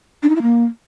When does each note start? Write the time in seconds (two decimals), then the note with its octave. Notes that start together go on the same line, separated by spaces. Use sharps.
0.23 D4
0.29 D#4
0.36 E4
0.42 A#3